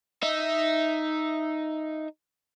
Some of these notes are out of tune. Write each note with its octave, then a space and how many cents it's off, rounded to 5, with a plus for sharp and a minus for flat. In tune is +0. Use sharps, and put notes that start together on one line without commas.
D#4 +0 E5 +0